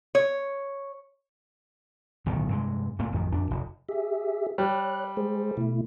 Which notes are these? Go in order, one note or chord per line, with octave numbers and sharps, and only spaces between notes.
C#5
D1 B1 A2 D#3
G2 C3 G#3
A#2 A3 A#3 C4
A1 F2 D#3
F2 D4
F1
G4 G#4 E5
G3 C#5 F#6
G#3 G#4 C5
B2 A3 E4